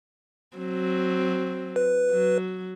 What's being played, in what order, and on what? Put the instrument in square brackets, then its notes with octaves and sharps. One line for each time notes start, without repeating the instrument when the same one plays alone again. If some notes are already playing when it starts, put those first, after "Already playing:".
[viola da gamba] F#3 C4
[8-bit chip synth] B4
[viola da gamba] F#3